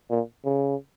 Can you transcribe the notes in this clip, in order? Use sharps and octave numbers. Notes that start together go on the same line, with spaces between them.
A#2
C#3